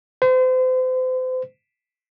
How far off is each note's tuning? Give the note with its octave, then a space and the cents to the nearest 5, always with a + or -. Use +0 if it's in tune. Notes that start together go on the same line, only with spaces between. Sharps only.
C5 -35